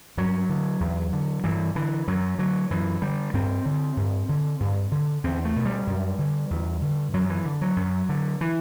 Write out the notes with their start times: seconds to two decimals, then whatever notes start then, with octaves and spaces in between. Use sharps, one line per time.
0.17 G2 F#3
0.49 D3
0.80 E2
1.13 D3
1.44 G2 E3
1.75 D3 E3
2.08 F#2 F#3
2.39 D3 F#3
2.70 F#2 E3
3.02 D3 G3
3.33 G2 C4
3.65 D3
3.97 G2
4.29 D3
4.60 G2
4.92 D3
5.24 E2 C4
5.45 A3
5.56 B2
5.65 G3
5.87 F#2
6.19 D3
6.51 E2
6.82 D3
7.13 F#2 F#3
7.30 E3
7.45 D3
7.61 F#3
7.76 F#2
8.09 D3
8.41 E3